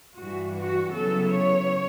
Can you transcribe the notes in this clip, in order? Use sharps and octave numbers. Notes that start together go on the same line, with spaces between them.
G2 E3 G3 F#4
F#4
C#3 F#3 B3 E4 A4
C#5